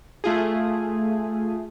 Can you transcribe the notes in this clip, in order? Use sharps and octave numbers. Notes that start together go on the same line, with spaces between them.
A3 F4 G#4